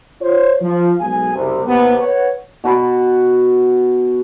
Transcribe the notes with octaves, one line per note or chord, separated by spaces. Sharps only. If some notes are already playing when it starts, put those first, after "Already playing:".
F4 C5 C#5
F3
B1 G#3 G#4 G#5
F#1 C2 C3
D#2 C3 B3
B4 C#5 F#5
B2 F#4 B5